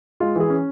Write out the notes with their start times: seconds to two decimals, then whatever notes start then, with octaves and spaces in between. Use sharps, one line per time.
0.20 G#3 F4
0.36 E3 G#4
0.50 C#4